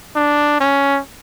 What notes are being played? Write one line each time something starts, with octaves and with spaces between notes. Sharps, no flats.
D4
C#4